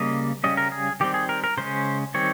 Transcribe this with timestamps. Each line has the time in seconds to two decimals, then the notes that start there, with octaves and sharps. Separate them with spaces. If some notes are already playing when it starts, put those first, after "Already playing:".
Already playing: C#3 G3 A#3 D#5
0.44 C#3 G3 C#4 D#5
0.57 A#4
0.72 G#4
1.00 D#3 G3 C4 G4
1.14 G#4
1.29 A#4
1.44 A#4
1.57 C#3 G#3 C#4 C5
2.14 D#3 G3 C4 C#5